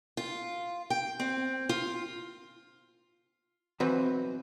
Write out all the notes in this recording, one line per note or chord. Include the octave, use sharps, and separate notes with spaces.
F4
G5
C4
F4
B1 E3 F3 C4 F#4 B4